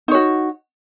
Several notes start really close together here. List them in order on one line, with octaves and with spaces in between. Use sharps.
D#4 C#5 F#4